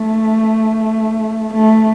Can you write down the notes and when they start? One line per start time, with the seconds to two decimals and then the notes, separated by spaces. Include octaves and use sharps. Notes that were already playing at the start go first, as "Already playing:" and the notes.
Already playing: A3
1.54 A3